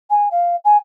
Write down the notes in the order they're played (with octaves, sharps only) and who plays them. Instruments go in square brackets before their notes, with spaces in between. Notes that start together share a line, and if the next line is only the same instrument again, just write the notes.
[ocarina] G#5
F5
G#5